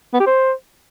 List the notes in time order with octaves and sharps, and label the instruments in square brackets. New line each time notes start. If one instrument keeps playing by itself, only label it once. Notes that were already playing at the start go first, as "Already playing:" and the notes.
[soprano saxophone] B3
G4
C5